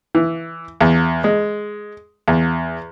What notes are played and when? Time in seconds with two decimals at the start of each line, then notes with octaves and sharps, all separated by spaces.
0.15 E3
0.81 E2
1.24 G#3
2.28 E2